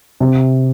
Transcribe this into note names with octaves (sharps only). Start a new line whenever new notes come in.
C3